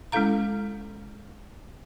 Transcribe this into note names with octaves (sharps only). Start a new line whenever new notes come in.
G#3 C#4 E4 A4 F5 A#5